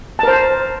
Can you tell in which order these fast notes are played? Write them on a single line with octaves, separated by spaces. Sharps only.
A5 A#4 C5